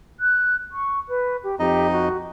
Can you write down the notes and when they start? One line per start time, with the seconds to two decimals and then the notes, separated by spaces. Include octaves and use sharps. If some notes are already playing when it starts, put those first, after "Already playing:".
0.20 F#6
0.71 C#6
1.08 B4
1.43 G4
1.59 F2 D#4 G4 D#5
1.91 F#4